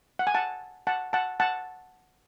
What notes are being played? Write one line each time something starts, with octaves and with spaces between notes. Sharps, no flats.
F#5
G#5
F#5 A5
F#5 A5
F#5 A5
F#5 A5